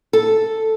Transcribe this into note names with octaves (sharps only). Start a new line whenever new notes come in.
A4